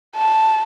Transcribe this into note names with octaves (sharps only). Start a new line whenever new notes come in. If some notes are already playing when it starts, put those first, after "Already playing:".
A5